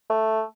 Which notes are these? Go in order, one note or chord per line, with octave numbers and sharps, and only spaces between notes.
A3